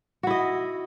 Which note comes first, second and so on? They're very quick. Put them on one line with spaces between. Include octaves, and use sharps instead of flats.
F#4 E4 D#5